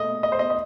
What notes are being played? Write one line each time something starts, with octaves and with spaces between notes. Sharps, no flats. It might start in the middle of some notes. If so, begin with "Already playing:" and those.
Already playing: B2 A3 D#5
D#5
C5
D#5
D#5